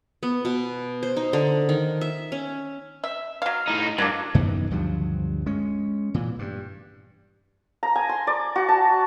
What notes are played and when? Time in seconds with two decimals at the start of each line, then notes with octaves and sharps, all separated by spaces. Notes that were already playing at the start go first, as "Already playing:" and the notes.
0.23 B3
0.45 B2
1.03 C5
1.16 D#4
1.33 D3
1.69 D#3
2.01 E5
2.32 C#4
3.04 E5
3.42 F#3 F5
3.68 A2 D#4
3.98 G2 F#3 A#3 D4
4.35 F#2 D#3 E3 B3
4.71 D2 G2 F3 F#3
5.46 G#3 C#4
6.14 A#2 E3
6.39 G2
7.83 A#5
7.95 G#5
8.09 C6
8.27 D5
8.56 F#4
8.69 A5